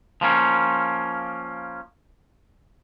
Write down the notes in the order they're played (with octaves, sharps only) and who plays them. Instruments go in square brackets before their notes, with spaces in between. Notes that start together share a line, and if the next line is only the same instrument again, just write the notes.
[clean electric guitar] F3 A#3 C#4